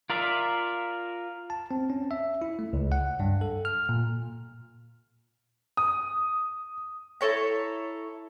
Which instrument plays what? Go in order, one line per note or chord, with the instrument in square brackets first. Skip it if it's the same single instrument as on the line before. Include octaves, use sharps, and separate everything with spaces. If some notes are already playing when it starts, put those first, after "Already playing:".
[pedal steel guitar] F4 A#4 D5 E5
[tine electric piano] A5
C4
C#4
E5
E4
A3
C#2
F#5
G2
A4
F6
A#2
[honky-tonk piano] D#6
[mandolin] E4 A4 C#5 A#5